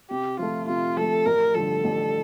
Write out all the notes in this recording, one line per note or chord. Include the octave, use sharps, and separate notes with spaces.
C3 G4
F3 A3 F4
C3 F4
F3 A3 A4
A1 A#4
G2 D3 F3 A4
A1